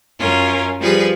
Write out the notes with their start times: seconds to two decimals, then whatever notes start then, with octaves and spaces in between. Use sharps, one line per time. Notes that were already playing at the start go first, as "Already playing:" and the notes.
0.19 F#2 C#4 F4 A#4
0.79 F3 G3 G#4 B4